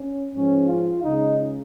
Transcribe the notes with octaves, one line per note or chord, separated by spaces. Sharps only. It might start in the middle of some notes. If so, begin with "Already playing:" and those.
Already playing: C#4
G#2 F3 G#3 C#4
F4
C#2 C#3 G#3 D#4